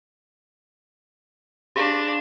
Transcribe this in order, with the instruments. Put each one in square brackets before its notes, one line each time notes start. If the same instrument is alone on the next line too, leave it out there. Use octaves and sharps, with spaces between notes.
[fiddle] D4 [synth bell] G4 G#4 F5